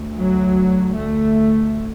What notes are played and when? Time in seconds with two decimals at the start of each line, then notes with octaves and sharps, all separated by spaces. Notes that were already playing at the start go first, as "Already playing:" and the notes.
Already playing: D2
0.19 F#3
0.95 A3